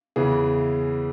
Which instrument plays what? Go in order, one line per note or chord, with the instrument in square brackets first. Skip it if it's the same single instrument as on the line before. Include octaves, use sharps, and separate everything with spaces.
[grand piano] E2 C#3 E3 G#4